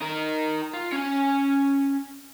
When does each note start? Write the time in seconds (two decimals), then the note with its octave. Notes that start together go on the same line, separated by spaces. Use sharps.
0.01 D#4 A#4
0.73 F4
0.92 C#4 G#5